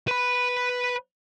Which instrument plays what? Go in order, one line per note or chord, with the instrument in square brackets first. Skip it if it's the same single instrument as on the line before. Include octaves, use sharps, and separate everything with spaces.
[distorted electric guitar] B4 B5